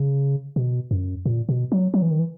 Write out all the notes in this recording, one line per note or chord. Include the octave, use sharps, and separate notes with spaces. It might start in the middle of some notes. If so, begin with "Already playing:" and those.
Already playing: C#3
B2
F#2
A#2
B2
F#3
F#3
E3
D#3
E3